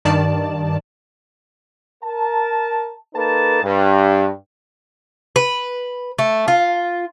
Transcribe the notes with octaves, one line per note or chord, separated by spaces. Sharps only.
G2 D#3 D5 A5
A#4 A5
A#3 D#4 A4 B4 A5
G2
B4
A3
F4